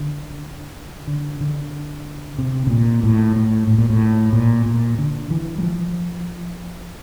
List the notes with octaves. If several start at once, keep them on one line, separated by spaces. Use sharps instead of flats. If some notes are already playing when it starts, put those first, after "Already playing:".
Already playing: D3
D3
D3
C3
C3
A#2
A2
A2
A2
A#2
A2
A#2
A#2
D3
E3
G3
F3